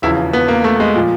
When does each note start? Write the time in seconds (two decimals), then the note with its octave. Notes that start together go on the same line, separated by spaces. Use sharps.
0.02 E1 E2 C#3 F3 E4
0.33 B3
0.48 A#3
0.64 A3
0.80 G#3
0.96 A#2 F3